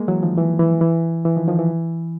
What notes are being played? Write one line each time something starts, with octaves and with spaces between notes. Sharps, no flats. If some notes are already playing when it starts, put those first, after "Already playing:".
Already playing: G#3 A#3
E3 F#3
D#3 F3
E3
E3
E3
E3
D#3 F3
D#3 F3
E3